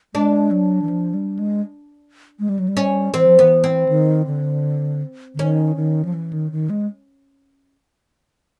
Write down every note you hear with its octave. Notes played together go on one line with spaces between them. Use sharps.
G#3 D4
F#3
E3
F3
G3
G#3
G#3
G3
F#3
G3
C#4
E3 C4
F3
E3 B3
C4
D#3
D3
D3
D#3 C#4
D#3
F3
E3
D#3
D#3
G#3